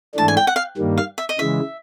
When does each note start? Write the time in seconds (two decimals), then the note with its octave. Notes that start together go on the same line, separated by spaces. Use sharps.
0.15 G#2 E3 A3 D4 A5
0.28 G#5
0.37 G5
0.47 F#5
0.56 F5
0.77 G2 D#3 G3 A#3
0.98 F5
1.18 E5
1.29 D#5
1.39 C#3 E3 G#3 E5